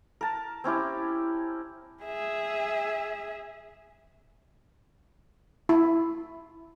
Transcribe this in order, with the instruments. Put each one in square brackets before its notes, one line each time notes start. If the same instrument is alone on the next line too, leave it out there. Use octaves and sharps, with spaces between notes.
[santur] A#4 A5
C4 C#4 E4 G4
[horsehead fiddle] G#4 E5
[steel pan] E4